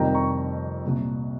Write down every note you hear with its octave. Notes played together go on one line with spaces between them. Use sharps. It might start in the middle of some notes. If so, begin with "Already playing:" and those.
Already playing: F1 F2 D#3 G3 G5 A#5
A#5 C#6
C2 A#2 G3